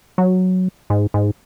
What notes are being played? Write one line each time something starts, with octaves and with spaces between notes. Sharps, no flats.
F#3
G#2
G#2